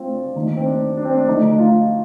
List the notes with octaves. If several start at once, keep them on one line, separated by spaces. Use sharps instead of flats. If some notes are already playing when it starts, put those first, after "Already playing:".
Already playing: A3 C4 F4
D4
D#2 D#3 A3 D#4
C4
D4
D4
C4
D4
D2 D3 F3 A3 D#4
D#4
F4